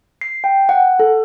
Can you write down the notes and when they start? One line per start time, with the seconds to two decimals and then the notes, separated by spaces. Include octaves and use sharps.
0.21 C7
0.44 G5
0.69 F#5
1.00 A4